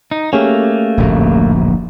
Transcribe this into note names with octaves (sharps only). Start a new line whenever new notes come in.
D#4
A3 A#3 C#4 G4 G#4
D1 A#1 F#2